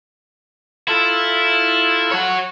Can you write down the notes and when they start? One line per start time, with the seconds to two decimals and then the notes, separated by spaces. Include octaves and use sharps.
0.88 E4 F4 A4
2.11 C#5 F#5